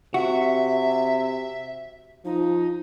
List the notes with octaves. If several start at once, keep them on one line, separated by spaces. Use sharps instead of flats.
C3 F#4 E5
F3 D#4